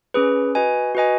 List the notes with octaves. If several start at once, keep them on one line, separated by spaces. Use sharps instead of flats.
C#4 G#4 B4
F#4 B4 D#5 G#5
F#4 B4 D#5 G#5